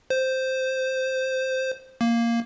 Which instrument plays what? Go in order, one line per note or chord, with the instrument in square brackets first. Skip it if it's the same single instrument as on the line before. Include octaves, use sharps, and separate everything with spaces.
[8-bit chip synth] C5
A#3